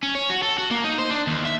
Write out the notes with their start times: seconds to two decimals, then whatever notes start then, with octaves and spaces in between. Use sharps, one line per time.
0.03 C#4
0.15 C#5
0.30 F#4
0.43 A4
0.58 F#4
0.71 A#3
0.84 D#4
0.98 C5
1.10 D4
1.27 D#2
1.45 E5